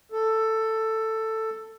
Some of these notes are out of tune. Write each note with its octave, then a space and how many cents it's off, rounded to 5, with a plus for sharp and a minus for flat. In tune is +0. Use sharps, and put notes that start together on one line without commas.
A4 +10